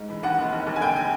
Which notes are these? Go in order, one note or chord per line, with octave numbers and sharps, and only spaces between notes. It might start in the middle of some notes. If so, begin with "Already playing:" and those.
Already playing: G#2
E3
D#2 F#5
F1
D#2
D#2
G#5
D3 G5
G#5